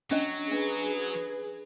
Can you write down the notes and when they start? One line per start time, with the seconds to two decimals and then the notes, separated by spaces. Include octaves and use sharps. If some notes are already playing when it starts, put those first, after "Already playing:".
0.11 F#3 C#4 D4 D#5
0.51 D4 G#4 B4